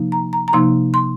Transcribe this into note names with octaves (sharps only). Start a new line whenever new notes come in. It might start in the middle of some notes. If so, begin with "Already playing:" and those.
Already playing: C3 F3 A#3 D#4
A#5
A#5
A#5
C3 F3 A#3 D#4 C6
C6